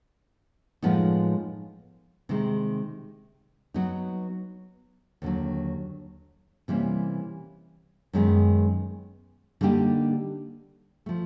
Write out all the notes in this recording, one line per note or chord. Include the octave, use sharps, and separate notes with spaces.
A2 F3 G#3 B3 D#4
C3 D#3 G#3
F#3 B3 D#4
D#2 D3 F#3
C3 E3 G3 A#3 C#4
F#2 D#3 G#3 B3 D#4
D3 G3 A#3 D#4 G4
F3 A3